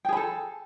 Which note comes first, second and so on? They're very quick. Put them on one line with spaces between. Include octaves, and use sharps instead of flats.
G5 G#4 B5 A4